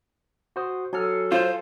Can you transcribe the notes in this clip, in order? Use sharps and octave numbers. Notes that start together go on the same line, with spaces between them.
F#4 C5 D#6
F#3 G#4 A4 F6
F4 C5